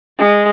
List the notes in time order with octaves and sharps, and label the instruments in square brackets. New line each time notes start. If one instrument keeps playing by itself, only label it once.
[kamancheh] G#3